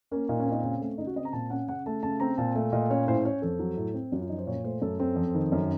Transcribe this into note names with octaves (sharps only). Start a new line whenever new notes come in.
A#3 C#4
A#2 D#4
C#4
C4
D#4
C#3 C#4
A3
C#3 D#4
F#4
C4 D#5
A#5
A#2 A5
C#4 F#5
C#3 F#5
A3 A5
C#3 A5
C4 A#5
A#2 A5
A3
A#2 D#5
C#4 C#5
A2 C5
C#4 C#5
F2 A4
F#3
A2
C4
F#2 F#4
F4
F3 D#4
C5
A#2 C#5
A3 C5
F#2 A4
C4 A4
F2
D#3
F#2